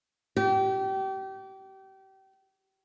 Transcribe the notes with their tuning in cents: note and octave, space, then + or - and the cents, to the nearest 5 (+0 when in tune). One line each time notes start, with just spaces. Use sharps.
G4 -30